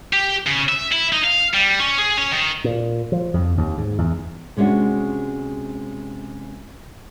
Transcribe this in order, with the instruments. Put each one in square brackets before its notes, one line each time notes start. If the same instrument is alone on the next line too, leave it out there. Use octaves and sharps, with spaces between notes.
[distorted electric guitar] G4
C#3
E5
E4
D#4
F5
G3
C#4
G#4
C#4
D#3
[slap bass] A#2
F3
F2
D#2
G#2
E2
[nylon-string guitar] C3 G#3 C#4 D4 F#4